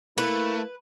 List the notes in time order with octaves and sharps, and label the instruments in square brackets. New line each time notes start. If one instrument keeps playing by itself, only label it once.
[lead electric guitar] A3 [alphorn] A#3 [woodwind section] E4 [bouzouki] B4